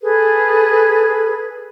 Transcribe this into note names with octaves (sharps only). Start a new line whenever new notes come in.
G#4 A4 B4